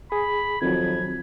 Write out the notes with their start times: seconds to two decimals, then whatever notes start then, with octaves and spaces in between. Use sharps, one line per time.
0.12 G#4 B5
0.62 F2 D#3 F#3 G#6